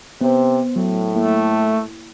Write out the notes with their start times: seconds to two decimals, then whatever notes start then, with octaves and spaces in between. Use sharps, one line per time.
0.21 C3 B3 C5
0.76 A2 F#3
1.15 A3 A#3 E4